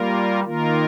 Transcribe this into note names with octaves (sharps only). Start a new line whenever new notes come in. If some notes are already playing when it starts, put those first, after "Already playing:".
Already playing: G3 A#3 F4 A#4
D#3 A#3 F4 A#4